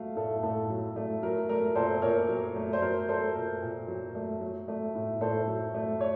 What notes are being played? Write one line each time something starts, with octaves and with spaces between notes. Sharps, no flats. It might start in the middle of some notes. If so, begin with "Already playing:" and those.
Already playing: F#3 A3 F5
A2 A4
A2 A4
F#3
A3
F#3 A#4
A3 A#4
A#2 A4 C5
A#2 A#4 C#5
F#3
A3
C5
F#3 A#4
A3 A4 C5
A#2 A#4
A#2
F#3
A3
F#3
A3
A2
A2 A4 C5
F#3
A3
C#5